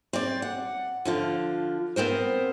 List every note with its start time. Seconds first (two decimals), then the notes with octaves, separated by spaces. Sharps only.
0.13 C4 D5
0.42 F#5
1.05 D3 F3 F4
1.96 B3 C4 A#4 C5